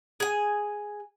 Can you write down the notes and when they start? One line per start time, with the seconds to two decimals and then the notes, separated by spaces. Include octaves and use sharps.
0.20 G#4 G#5